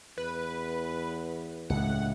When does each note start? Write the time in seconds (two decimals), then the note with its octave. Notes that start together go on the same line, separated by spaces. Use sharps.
0.18 E2 B4
1.70 C#2 A2 F#5